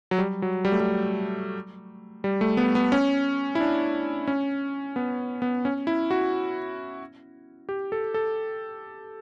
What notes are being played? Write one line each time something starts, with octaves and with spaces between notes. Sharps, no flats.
F#3
G3
F#3
G3
A3
G3
G3
A3
B3
B3
C#4
E4
D4
C#4
B3
B3
C#4
E4
F#4
G4
A4
A4